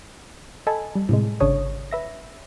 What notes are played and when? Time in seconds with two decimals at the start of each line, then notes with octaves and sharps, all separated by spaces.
0.67 A4 D#5 G#5 A5 B5
0.95 G3
1.09 A2 C3 G#3
1.40 G#1 C#3 D4 C#5 D#6
1.91 B4 E5 A#6